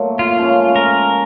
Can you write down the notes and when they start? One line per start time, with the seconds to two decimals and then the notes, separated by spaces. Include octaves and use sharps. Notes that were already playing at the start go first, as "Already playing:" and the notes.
Already playing: A#2 F#3 A3
0.19 F4
0.37 G#2 F3 A3 C#4
0.76 A#4